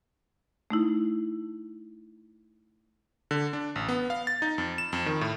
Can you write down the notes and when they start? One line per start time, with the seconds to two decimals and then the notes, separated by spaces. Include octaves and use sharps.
0.70 A3 D#4 E4
3.31 D3
3.53 D4
3.76 A1
3.89 B3
4.10 F5
4.27 A6
4.42 D#4
4.58 F2
4.78 E7
4.93 F2
5.06 D#3
5.21 A2